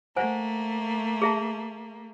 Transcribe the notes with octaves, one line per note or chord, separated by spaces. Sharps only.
A3 A#3 C5 F#5 G#5
G#4 E5 A5